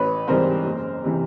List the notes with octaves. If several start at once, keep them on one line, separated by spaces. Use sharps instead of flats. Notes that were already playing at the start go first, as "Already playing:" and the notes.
Already playing: A1 B4 C#5
G#2 E3 G3 C4 A#4 C5
F#1
C3 E3